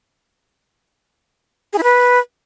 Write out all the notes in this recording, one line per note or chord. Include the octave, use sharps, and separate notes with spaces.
G#4
E4
B4